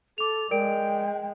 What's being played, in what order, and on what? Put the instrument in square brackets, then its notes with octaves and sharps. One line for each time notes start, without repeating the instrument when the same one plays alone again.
[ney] A4 [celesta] D6 F7
[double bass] G#3 [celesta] A#4 D5 D7 [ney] G5